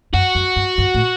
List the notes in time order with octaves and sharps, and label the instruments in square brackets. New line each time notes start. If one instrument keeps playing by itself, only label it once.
[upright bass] F#2 [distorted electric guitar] F#4
[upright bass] F#2
G2
G2
A2